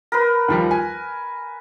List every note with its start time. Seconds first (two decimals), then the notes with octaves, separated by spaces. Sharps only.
0.12 A#4 B4
0.48 D#2 F3 G3
0.71 G#5